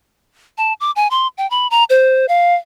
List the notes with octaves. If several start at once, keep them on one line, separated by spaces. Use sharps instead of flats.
A5
D6
G#5
C6
G5
B5
A#5
C5
F5